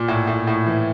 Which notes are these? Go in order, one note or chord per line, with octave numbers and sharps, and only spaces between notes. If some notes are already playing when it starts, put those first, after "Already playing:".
Already playing: A#2
A2
A2
A2
E3